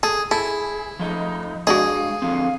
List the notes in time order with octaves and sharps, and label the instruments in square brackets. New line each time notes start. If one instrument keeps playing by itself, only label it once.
[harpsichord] G#4 [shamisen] A4
[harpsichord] E4 [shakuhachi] G#4 [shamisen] A4
[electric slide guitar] F3 A3 D#5 [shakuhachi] D#4
[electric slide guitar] G#3 D4 [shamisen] F#4 D5 D#5 [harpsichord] G#4 [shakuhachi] F5
[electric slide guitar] D3 F3 C4 [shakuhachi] F5